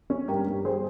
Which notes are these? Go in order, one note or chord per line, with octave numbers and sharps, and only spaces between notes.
C#4
G2 G4 A#4
G2
G3 G#4 C5